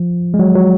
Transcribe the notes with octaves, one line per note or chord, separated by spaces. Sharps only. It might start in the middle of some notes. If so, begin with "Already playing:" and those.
Already playing: F3
G#3
F#3
F#3